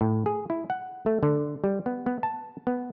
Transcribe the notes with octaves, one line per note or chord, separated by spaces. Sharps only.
A2
G#4
E4
F#5
A3
D3
G3
B3
B3
A5
B3